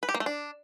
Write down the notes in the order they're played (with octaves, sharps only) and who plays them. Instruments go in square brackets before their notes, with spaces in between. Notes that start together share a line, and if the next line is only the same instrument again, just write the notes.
[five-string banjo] B4
G4
A#3
A3
D4